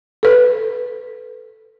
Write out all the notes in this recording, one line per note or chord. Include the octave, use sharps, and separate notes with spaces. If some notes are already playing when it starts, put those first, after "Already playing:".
A4 B4